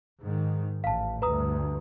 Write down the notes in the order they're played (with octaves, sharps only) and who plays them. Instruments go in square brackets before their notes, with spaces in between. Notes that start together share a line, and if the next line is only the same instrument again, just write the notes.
[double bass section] G#2 D#3
[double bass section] A1 [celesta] F5 A5
[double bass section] D2 G2 [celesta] B4 A#5 D#6